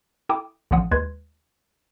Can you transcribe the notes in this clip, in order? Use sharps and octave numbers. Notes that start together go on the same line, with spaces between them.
E4 A4 G5 D6 D#6
A1 D3 F3 F#5 D#6
D#2 G#3 B4 C6 G#6